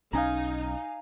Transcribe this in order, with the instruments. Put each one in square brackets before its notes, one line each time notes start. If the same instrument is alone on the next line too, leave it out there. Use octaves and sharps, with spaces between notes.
[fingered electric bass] B1 C#4 [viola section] D#4 [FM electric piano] F5 G#5 A#5